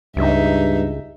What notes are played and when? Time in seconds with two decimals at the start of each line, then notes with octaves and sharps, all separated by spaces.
0.16 C#2 G2 D#4 E5